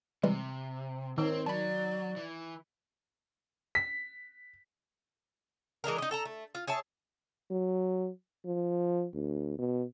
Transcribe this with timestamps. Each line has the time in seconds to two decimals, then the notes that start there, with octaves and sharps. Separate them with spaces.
0.23 C3 E3 G3 G#3
1.18 D#3 C4 C#5
1.46 F#3 D5 A5 B5
2.16 E3
3.75 B6
5.84 E3 G#3 D4 A#4
5.98 D#4 D#5
6.11 A4 A5 A#5
6.25 A3
6.55 F4
6.67 G#4 C#5 E5 A5
7.50 F#3
8.45 F3
9.14 D2
9.58 B2